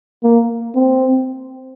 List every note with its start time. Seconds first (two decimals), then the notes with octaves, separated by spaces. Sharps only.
0.23 A#3
0.75 C4